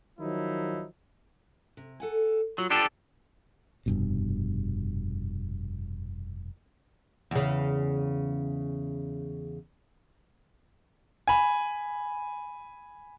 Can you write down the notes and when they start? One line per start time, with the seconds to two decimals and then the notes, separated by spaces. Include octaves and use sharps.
0.19 D#3 F3 F#3 D#4 E4
1.77 C3
2.00 A4 F#5 G#5
2.58 F#3 F4
2.70 D4 G4 A4
3.86 F1 G2 B2
7.31 E2 C#3
11.27 G#5 B5